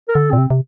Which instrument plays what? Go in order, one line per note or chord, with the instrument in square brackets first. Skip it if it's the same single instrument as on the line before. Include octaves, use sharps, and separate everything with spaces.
[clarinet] A#4
[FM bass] D3 [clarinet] A4
[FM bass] A#2 [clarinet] C4
[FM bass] C3
C3